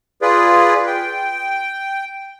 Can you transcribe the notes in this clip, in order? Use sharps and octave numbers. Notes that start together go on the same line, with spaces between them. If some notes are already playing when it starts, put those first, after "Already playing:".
F4 G#4 B4 D5
G5